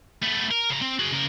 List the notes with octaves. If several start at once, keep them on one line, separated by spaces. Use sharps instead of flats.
A3 B3
A#4
C#3 A#5
C4
F#4 G#4
C#3 A#4